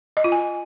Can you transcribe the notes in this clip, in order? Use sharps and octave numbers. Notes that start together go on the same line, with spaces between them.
D#5
F4
G#5